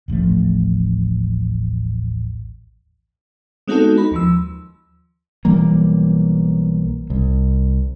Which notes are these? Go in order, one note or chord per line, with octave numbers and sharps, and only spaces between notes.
D#1 A1 F3 A3
G#3 B3 C4 D#4 F#4 A4
D#4 B5
D#2 F3 E6
B1 E3 G3 A#3
C2